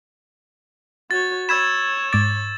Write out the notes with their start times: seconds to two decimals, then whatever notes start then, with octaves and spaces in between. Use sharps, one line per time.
1.11 F#4 C#5 A6
1.49 C#5 B5 E6 G#6 E7
2.13 G#2 D6 A6